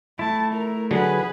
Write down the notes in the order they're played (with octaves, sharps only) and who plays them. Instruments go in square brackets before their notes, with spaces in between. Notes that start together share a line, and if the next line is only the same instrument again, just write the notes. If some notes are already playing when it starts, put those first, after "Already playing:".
[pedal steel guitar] A3 E4 [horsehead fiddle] A5
[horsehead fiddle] A#4
[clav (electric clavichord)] D3 F#3 [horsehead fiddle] G#4 B4